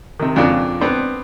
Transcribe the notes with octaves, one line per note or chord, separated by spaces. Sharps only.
C3 D#3
F2 A#2 C#3 D4 F4
B3 C4 D4